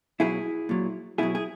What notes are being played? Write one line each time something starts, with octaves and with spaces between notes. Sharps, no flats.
B2 F#3 E4 G#4
A#2 F#3
B2 F#3 E4 G#4
G#4